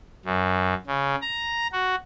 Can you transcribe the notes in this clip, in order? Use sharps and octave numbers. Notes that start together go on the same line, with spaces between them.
F#2
C#3
A#5
F#4